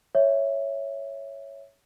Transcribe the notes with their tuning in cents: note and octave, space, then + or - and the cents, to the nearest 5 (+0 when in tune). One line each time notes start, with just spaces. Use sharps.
C#5 +0 E5 +0